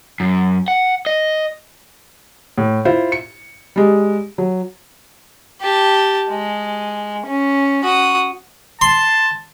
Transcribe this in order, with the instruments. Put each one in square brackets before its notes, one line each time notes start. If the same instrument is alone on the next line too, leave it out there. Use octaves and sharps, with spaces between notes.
[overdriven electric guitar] F#2
F#5
D#5
[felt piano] A2
E4 F4 C5
C#7
G3 G#3
F#3
[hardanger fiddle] G4 A5
G#3
C#4
F#4 D#6
[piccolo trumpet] A5 [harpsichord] C6